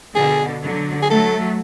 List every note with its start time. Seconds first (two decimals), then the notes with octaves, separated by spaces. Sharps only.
0.15 B2 D3 G#4
0.62 D3 F#3
1.02 G#4
1.10 F#3 A3 A4